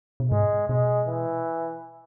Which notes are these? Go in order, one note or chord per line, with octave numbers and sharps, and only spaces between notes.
B2
G#2 G#3
B2 G#3
E3